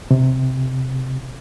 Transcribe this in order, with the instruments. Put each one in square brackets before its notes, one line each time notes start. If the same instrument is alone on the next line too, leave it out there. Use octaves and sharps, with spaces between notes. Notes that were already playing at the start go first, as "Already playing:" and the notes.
[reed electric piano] C3